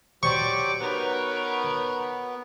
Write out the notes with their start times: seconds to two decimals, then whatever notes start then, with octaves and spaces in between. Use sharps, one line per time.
0.23 F#3 G4 C5 D5 C#6 D6
0.80 B3 D#4 F#4 A#4 B4 C#5